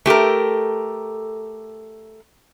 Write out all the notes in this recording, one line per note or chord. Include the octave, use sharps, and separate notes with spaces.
A3 G4 A4 A#4